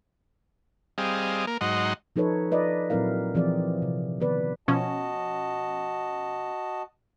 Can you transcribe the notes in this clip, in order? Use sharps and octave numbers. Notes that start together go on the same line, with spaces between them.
G3 C4 G#4 D#5 F5
A#3 A#4
G#2 F#3 D#4 D#5 F#5 C6
F3 D#4 A4 B4 C#5
F4 B4 D5 D#5
A#2 F#3 C4 E4 A#4 F5
E3 F3 C4 G#4 D5
C3
D#3 B3 B4 D5
B2 F3 C#4 F#4 D#5 A5